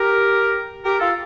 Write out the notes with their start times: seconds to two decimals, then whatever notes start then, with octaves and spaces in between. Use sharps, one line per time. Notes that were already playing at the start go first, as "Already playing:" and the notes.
Already playing: G4 A#4
0.84 G4 A#4
1.00 F4 A4